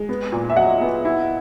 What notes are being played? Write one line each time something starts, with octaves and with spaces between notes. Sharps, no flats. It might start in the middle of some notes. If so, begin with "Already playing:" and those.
Already playing: G#3
B3
A#2
E5
F#3 D#5 F#5
B3
E4